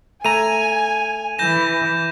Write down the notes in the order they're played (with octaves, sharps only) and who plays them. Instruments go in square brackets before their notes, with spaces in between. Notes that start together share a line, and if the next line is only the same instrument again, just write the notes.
[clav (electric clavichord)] A3 A#5 [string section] G#5 [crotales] D#7 F7
[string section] E3 [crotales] G6 A#6 E7